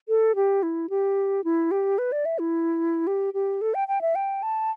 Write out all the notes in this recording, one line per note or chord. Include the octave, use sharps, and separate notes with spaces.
A4
G4
E4
G4
E4
G4
B4
D5
E5
E4
G4
G4
A4
G5
G5
E5
G5
A5